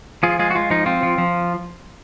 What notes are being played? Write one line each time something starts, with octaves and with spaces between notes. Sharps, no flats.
F3 F4 G#4
G#3 F4 G#4
F#4
G#3 F4
F3 D#4
C4 F4
F3
F3